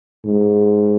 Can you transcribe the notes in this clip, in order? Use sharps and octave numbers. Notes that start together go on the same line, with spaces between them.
G#2